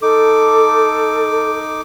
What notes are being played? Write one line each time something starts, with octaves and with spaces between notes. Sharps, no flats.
D#4 A4 D6